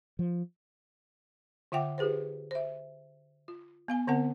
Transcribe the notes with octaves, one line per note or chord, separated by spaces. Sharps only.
F3
D3 F4 E5 F#5 G5 D6
F4 G4 G#4 B4 C5
C5 E5
F4
B3 F5 G#5
D3 B3 C4 A#4 F#5